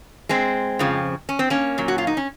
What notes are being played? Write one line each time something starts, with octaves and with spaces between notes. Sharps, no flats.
G#3 C4
F2 C#3 F3
C#4
C4
A#3 C#4
A#2 F#3
F#4
F4
D#4
C#4